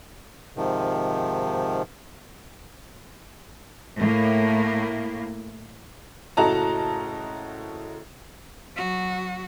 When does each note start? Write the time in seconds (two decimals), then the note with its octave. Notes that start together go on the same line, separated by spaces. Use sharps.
0.57 G#2 C3 D#3 F3
3.98 A2 A#3
6.37 F#1 A2 F#4 D#5 A5 A#5
8.76 F#3 F#4